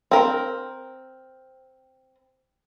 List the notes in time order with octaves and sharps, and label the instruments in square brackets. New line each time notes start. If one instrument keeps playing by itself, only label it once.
[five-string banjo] C4 A#4